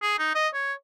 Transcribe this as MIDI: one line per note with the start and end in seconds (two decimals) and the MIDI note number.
0.02 0.15 68
0.18 0.33 63
0.35 0.48 75
0.54 0.73 73